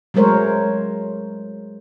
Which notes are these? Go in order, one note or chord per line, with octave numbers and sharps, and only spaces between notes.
F#3 G#3 A3 A#4 C5 C#5